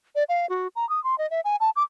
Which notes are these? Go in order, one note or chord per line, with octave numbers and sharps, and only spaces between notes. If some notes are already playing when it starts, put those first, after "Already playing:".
D5
F5
F#4
A#5
D#6
C6
D#5
E5
G#5
A5
D6